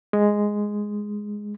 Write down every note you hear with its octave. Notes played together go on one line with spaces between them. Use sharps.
G#3